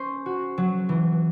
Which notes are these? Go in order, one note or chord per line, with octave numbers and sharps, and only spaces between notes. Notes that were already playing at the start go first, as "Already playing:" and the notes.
Already playing: C#4 C5
F#4
F#3
E3